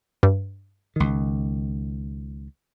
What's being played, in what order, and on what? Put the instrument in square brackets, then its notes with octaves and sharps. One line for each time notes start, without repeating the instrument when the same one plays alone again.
[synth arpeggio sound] G2
[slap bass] C#2 D#3